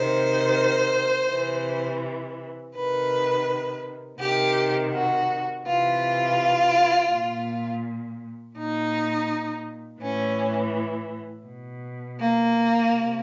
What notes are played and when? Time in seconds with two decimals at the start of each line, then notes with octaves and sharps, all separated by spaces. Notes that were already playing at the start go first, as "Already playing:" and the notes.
Already playing: C3 D#3 C5
1.30 C3 E3
2.75 C3 D#3 B4
4.20 C3 D#3 G4
4.94 F#4
5.65 C3 E3 F4
7.12 A#2
8.56 A#2 D#4
10.01 A2 E3 C#4
11.46 B2
12.19 A#3
12.91 C3